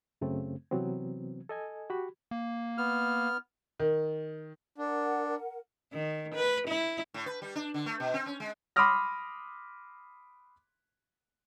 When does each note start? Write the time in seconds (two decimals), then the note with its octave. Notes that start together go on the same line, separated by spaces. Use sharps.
0.21 F#2 C#3 A3 C4
0.71 C3 E3 F#3 B3 C4
1.49 A4 D#5 G#5
1.90 F#4 G4 B5
2.31 A#3
2.78 B3 F6
3.80 D#3
4.78 D4 A#4 F#5
5.93 D#3
6.35 B4
6.68 E4
7.14 A2
7.26 B4
7.42 G3
7.55 D4
7.74 D3
7.86 A3
8.00 B2
8.14 C4
8.26 C#4
8.40 G#3
8.76 B5 C6 D6 D#6 F6 A#6